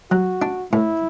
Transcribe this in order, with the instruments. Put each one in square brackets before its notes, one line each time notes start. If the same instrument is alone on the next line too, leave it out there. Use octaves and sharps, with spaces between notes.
[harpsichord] F#3 [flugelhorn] F#4
[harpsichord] D4
[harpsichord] A2 [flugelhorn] E4